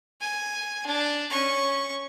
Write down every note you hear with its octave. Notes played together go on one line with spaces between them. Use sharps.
G#5
D4
C#4 C#6